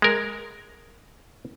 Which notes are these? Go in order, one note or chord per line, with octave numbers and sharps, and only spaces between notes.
G#3 A#4